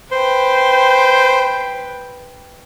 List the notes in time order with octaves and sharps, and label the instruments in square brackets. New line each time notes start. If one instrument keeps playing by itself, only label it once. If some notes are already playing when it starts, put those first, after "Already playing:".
[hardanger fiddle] B4 G5 [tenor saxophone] C5